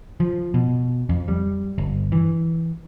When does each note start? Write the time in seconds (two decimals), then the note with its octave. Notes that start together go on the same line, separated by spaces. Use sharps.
0.20 F3
0.54 B2
1.09 F2
1.28 G3
1.78 G1
2.12 E3